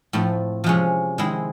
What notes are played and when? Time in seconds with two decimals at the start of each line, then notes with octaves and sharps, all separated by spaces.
0.13 A2 F3 A3 C4
0.64 C3 F3 G#3 C#4
1.18 D#3 G#3 C4 E4